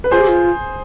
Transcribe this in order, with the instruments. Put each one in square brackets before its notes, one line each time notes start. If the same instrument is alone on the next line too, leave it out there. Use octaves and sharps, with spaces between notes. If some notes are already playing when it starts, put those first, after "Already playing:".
[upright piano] B4
[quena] F4 [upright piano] G#4 C5
[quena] G4
F4